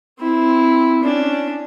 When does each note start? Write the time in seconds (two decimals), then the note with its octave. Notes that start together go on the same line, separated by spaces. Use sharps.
0.19 C4 E4
1.03 C#4 D4